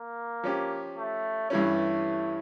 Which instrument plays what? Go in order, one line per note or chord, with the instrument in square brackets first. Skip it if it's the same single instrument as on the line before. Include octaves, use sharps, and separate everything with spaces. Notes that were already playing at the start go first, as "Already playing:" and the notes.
Already playing: [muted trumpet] A#3
[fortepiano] F3 C#4 G4
[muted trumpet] A3
[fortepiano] G2 E3 G3 C#4 [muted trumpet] A3